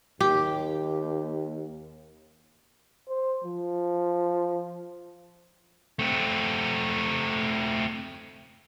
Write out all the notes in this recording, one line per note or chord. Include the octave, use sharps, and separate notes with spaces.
D#2 G4
C5
F3
A3 C4